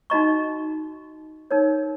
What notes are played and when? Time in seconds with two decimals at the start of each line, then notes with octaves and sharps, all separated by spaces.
0.10 D#4 F#4 D#5 A#5 C#6
1.51 D#4 A#4 C#5